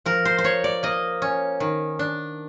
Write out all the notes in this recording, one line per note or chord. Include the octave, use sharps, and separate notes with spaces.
F3 A#4
C5
C5
F3 C#5
D5
A#3 D#5
C#4
D#3
D4